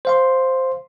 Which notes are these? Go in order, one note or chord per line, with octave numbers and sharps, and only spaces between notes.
C5 F5 C6